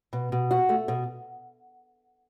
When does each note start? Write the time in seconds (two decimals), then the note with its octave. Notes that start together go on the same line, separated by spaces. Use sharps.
0.13 B2
0.32 B2
0.51 F#4
0.69 A3
0.88 B2